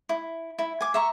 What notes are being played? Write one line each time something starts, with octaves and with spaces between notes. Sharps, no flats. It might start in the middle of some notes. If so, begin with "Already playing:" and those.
E4
E4
G#5 D6
E5 A#5 C#6